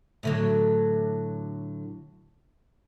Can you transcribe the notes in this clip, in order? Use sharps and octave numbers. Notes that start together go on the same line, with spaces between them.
A2 D3 F#3